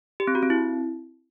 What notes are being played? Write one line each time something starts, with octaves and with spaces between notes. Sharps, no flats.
G4
C4
F#4
C4
E4